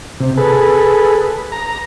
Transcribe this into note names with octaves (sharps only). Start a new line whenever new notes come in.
C3
G#4 A4 B4
A#5